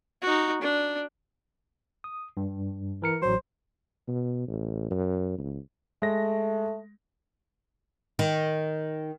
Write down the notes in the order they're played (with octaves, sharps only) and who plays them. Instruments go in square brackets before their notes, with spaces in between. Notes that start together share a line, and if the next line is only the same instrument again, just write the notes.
[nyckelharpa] D#4 F#4
D4
[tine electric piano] D#6
G2
E3 A#4 C#7
[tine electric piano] A1 F#3 [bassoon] C5
[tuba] B2
A1
F#2
C#2
[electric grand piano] G#3 A#6 [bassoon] A3
[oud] D#3